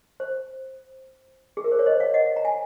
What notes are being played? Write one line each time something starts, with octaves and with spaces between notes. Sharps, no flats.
C5
G#4
A#4
C5
C#5
C5 D#5
C#5 F5
D#5 F#5
A#5
G#5